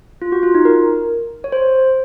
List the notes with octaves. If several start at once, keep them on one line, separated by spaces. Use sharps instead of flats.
F4
F#4
F4
D#4
A#4
C#5
C5